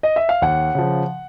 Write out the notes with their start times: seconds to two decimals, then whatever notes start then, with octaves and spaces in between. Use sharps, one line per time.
0.03 D#5
0.16 E5
0.29 F5
0.42 D#2 F#5
0.75 C#3 F3